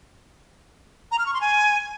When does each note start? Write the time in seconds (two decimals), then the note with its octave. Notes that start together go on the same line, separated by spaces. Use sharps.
1.12 A#5
1.19 F6
1.26 C#6
1.34 C6
1.41 G#5